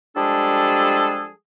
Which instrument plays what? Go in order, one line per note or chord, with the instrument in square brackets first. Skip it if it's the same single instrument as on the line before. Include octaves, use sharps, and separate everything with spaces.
[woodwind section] F3 G3 G#3 D4 G#4 A4